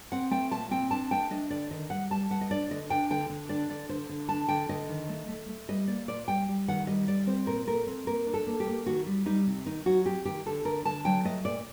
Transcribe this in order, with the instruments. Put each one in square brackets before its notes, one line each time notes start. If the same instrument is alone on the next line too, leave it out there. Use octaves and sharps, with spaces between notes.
[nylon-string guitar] C4 F#5
A3 G5
A#2 A5
C4 G5
D4 A5
A3 G5
D4 D#5
D3 D5
D#3 D#5
G3 F#5
G3 A5
G3 F#5
D#5
D4 D5
D3 D#5
D4 G5
D3 G5
D3
D4 D5
D3 D5
D3 C5
D3
D4 A5
D3 G5
D3 D#5
D#3
A3
A3
A3
G3 D#5
A#3 D5
A#2 D5
G3 G5
G3
D#3 F#5
G3 D#5
G3 D5
C4 C5
A#2 A#4
A3 A#4
C4
A#3 A#4
D4
A4
A#3
G4
A#3
D#3 F#4
G3
G3 D#4
C3
D#3 D#4
F#3 F#4
C4 G4
D#3 G4
D3 A4
D3 A#4
D3 A5
F#3 G5
A3 D#5
A#2 D5